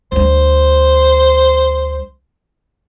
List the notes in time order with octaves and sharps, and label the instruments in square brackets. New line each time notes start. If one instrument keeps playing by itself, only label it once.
[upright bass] D2 G3 [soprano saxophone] C5